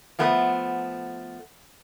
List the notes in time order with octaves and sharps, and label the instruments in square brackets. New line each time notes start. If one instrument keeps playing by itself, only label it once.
[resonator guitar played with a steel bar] F3 A3 B3